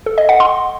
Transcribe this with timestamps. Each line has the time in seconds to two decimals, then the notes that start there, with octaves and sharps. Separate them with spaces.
0.06 A4
0.18 D#5
0.29 F#5
0.40 C6